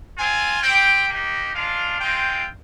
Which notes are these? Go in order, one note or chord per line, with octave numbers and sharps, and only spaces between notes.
C4 F4 G#5
C4 G4 G5
A#3 D#4 G4
G#3 D4 F4 F5
G#3 C4 F4 G5